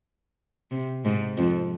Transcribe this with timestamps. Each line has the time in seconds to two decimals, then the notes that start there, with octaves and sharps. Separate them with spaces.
0.71 C3
1.04 G#2
1.37 F2